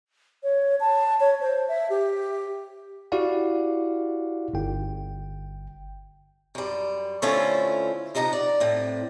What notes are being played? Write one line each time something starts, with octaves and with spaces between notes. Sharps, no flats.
C#5
A5
C#5
C5
E5
G4
E4 F#4 G4 D5 F5 F#5
G1 G5
F#2 G3
D3 A3 C#4 E4 F4 C5
C3 F3 D#4 F#5 A#5
D5
A2 C4